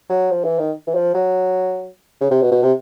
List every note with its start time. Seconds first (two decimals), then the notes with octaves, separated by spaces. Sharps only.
0.09 F#3
0.31 F3
0.45 E3
0.59 D#3
0.87 E3
0.95 F3
1.15 F#3
2.21 C#3
2.31 C3
2.42 B2
2.52 B2
2.63 C3